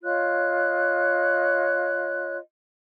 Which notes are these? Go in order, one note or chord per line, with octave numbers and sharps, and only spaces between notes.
F4 C#5 D#5 F#6